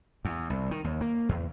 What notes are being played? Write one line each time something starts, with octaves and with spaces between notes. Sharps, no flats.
E2
C2
D#3
D#2
A#3
E2